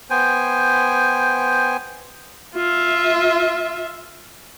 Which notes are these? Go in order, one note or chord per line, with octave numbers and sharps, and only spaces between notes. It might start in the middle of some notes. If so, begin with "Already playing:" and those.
B3 C5 G5 G#5
F4 E5